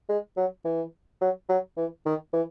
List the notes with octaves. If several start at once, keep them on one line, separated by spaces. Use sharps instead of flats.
G#3
F#3
E3
F#3
F#3
E3
D#3
E3